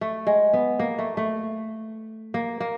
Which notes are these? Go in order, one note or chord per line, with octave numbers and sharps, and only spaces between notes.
A3
G#3
B3
A#3
A3
A3
A#3
A#3